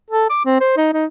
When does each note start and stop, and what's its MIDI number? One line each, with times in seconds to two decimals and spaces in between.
0.11 0.28 69
0.30 0.42 86
0.45 0.58 60
0.61 0.76 72
0.77 0.89 63
0.94 1.06 63